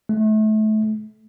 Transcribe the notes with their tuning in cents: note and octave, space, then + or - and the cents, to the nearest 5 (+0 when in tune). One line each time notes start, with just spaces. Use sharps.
A3 -30